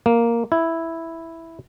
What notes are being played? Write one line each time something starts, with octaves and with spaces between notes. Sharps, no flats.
A#3
E4